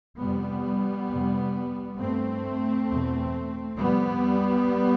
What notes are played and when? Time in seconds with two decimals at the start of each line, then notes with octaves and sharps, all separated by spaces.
0.19 F2 C3 G3 B3
1.10 F2 C3
2.00 G2 A3 C4
2.90 E2 B2
3.79 F2 C3 G3 B3